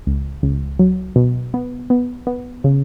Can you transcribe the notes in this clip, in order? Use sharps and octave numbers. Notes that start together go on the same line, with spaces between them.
C#2
C#2
F#3
B2
B3
B3
B3
C#3